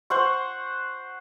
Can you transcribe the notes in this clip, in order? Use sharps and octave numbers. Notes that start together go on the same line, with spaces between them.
C5 F#5 C#6